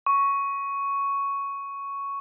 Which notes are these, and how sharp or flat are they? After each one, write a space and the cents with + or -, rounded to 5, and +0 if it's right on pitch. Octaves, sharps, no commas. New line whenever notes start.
C#6 +5